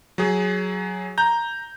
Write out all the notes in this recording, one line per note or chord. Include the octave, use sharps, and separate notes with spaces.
F#3 G#4
A#5 G6